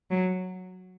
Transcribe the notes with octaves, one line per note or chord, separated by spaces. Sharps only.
F#3